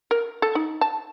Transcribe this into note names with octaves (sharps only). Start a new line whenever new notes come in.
A#4
A4
D#4
A5